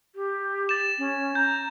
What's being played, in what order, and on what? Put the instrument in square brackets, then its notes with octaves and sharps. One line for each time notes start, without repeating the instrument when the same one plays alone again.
[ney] G4
[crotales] A6 E7
[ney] C#4
[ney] A#5 [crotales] G6